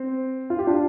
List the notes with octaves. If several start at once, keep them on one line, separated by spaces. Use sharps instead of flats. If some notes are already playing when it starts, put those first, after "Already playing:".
Already playing: C4
F4
G4
D4 F4